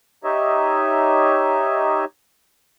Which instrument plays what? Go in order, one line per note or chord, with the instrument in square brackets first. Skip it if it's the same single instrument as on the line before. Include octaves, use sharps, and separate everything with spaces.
[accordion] D#4 G4 C#5 D#5 E5